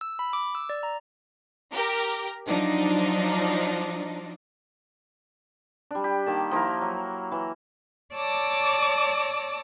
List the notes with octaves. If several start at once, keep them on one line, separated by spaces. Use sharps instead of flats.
E6
B5
D6
E6
D5
A#5
G4 A#4
F3 F#3 D4 D#4
G3 D4
G4
D#3 A#3 A5
F3 A#3 E4 A#4
F#3
E3
C#5 D5 A5 D6 E6 A#6